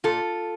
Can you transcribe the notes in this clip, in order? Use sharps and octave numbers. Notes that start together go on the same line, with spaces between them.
A#2 F4 A4